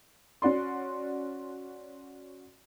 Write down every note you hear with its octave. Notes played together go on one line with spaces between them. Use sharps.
C#4 F#4 D5 C6